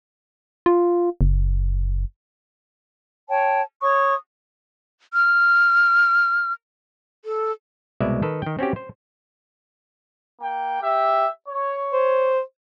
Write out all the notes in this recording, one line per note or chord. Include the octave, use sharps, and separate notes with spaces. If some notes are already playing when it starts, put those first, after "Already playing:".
F4
F#1
C#5 G5 A5
C#5 C#6 D#6
F6
A4
C2 B2 G#3 D5 E5
D#3 A4 B4
D#3 G5
C4 C#4 F#4 G4
C5
A#3 G5
G4 E5
C#5
C5